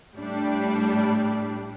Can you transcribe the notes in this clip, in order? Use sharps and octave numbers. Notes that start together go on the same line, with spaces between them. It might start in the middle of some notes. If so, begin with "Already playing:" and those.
A2 G3 D4